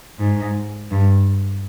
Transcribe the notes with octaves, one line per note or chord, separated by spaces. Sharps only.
G#2
G2